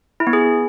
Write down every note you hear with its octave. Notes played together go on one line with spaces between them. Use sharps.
E4
B3
G#4